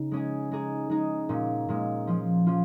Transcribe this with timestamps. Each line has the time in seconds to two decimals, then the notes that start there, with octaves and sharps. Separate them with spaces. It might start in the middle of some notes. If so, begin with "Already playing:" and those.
Already playing: C#3 D#4
0.11 G#3 C#4 G#4
0.51 G#3 D#4 G#4
0.90 G#3 D#4 G#4
1.29 A#2 G#3 C#4
1.69 A#2 G#3 C#4
2.07 F3 C#4 F4
2.46 F3 C#4 F4